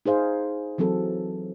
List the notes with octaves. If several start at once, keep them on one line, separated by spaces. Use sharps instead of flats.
D#4 G#4 C5 F5
E3 F#3 C4 A4